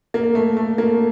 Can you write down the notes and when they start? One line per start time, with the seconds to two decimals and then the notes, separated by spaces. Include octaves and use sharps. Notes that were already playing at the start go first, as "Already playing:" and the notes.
0.14 A#3
0.35 A3
0.57 A3
0.78 A#3